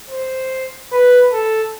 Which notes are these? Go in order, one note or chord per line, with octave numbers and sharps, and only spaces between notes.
C5
B4
A4